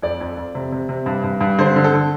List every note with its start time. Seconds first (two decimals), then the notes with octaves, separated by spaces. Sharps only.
0.02 F2 D5
0.20 F2
0.37 F2
0.55 C3
0.72 C3
0.89 C3
1.06 G2
1.24 G2
1.41 G2
1.59 D3 C5
1.76 D3
1.84 A4
1.93 D3